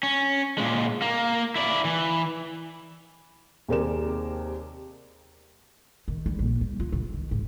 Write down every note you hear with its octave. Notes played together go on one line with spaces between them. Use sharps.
C#4
A#2 G#3
A#3
E4 D5
E3
D#2 C3 G#4 A#4 D5 E7
D#3
G3
A#1
G3
F4
C2
D#3
G#2